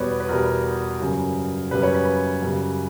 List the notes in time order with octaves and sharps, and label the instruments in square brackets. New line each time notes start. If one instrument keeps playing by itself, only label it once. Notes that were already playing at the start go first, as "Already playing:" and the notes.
Already playing: [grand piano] E2 B2 G3 B4 C#5 D5
B4
E2 B2 G3 A#4
F#2 C#3 G3
F#2 C#3 G3 B4
C#5
B4
F#2 C#3 G3